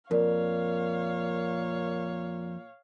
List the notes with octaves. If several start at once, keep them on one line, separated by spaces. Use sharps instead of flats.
F2 A#2 A#4 C#5 D5 F5